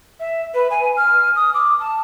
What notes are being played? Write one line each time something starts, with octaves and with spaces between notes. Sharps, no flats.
E5
B4
G#5
F6
D#6
D6
A5